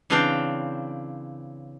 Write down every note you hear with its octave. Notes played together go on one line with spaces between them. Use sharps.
C#3 E3 C4 D4 F5 G5